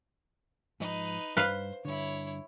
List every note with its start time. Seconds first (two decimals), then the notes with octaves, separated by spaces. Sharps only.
0.80 G#2 F3 D#4 B4 D#5
1.37 G2 B4 C5 F5
1.85 G2 D3 E4 C#5